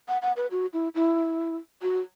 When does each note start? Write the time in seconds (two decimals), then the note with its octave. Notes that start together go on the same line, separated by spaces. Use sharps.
0.08 F#5
0.22 F#5
0.37 B4
0.51 F#4
0.73 E4
0.95 E4
1.82 F#4